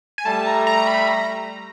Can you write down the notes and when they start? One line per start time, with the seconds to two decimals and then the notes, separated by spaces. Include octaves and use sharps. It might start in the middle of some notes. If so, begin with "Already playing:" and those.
0.18 G#5
0.25 G3 A3 A5
0.46 A#5
0.67 A#5
0.87 B5
1.08 A#5